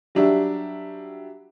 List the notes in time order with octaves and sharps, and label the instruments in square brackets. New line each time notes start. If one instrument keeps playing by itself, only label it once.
[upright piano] F#3 G3 D4 G4 E5